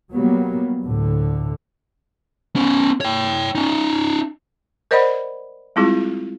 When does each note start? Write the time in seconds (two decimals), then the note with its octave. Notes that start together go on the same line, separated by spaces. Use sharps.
0.11 F#3 G3 A#3 B3
0.84 D2 A2 D3
2.56 B3 C#4
3.01 C#5 G5
3.55 C#4 D#4
4.91 A#4 C5 D5 D#5 F#5 B5
5.76 G3 G#3 C4 E4 F4 G#4